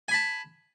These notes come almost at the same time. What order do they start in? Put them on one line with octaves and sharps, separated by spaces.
G#5 B5 A5